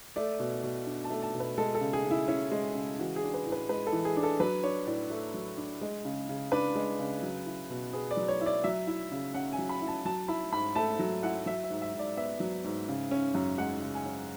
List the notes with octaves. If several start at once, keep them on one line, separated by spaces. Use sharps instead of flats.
A3 D5
B2
B2
D4
A5
A3
A5
B2
B4
G#3 A4
A4
C#3
G#4
C#3
E4
C#4 E4
G#3
C#3
E3 F#4
G#4
D4
B4
A2
B4
G#3 B4
A4
E3
G#4
D4
A4
F#3 B4
D4 C#5
A2 D5
A3
F#3
D4
G#3
C#3
C#3
D4 B4
G#3
C#3
F#3
E4
B2
B3 G#4
D5
F#3
C#5
E4
D5
F#3 E5
E4
C#3
C#4 F#5
G#5
F#3
B5
E4
A5
F#3 A5
E4 B5
G#2 B5
A3 A5
F#3
E4 F#5
F#3 E5
E5
G#2
E5
G#2
D5
B3 E5
F#3
G#2
C#3
C#4
F#2
G#3 F#5
C#3
G#5
C#4